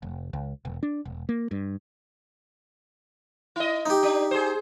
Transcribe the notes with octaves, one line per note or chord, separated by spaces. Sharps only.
F1
C#2
E1
D4
E1
A#3
G2
E4 D#5
D#4 G4
D4
G#4 C5